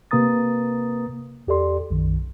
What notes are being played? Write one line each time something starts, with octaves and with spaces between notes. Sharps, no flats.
C3 A#3 B4 A#5 D#6 A6
E2 G4 A4 D5 C6
B1 F#2 D#3